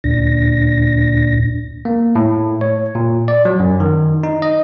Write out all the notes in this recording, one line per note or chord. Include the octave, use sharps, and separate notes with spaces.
D2 A#2 D4 A#6
A#3
A2
C#5
A#2
D5
F#3
F#2
D#3
D#4
D#5